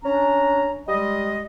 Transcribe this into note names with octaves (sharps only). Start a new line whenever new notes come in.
C#4 D4 A#5
G3 G#3 D#5